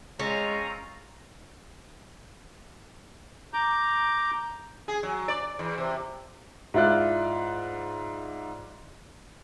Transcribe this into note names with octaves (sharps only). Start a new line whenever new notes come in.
G#3 C4 C#4 F4 A#5
A#5 D6 G6
G#4
F#3
D5
E2
C3
G#2 E4 F4 D5 F#6